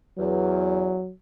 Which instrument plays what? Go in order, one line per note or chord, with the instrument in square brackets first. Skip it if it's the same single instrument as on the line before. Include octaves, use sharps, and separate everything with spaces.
[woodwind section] E2 [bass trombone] F#3